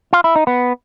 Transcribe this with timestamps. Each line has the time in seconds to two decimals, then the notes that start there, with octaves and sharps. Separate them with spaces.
0.13 F4
0.24 E4
0.36 D#4
0.47 B3